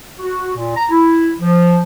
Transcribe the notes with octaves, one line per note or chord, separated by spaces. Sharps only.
F#4
A#2
A#5
E4
F3